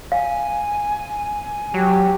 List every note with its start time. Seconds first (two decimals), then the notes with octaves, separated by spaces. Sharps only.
0.12 F5 G#5
1.74 F#3 G4